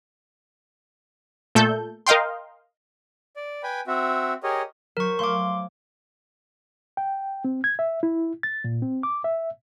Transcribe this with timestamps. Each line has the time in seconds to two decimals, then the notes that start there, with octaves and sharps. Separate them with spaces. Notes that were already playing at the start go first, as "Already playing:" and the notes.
1.55 A#2 A3 A4 G6
2.07 A#4 D#5 F5 G5 C6
3.36 D5
3.63 B4 G5 G#5 B5
3.87 C4 F#4 E5
4.43 G4 G#4 A#4 C#5 D#5
4.97 F#3 A#4 C5 C#6
5.19 A3 F5 C6 D6 G#6
6.97 G5
7.45 C4
7.64 G#6
7.79 E5
8.03 E4
8.43 A6
8.64 A#2
8.82 C4
9.03 D6
9.24 E5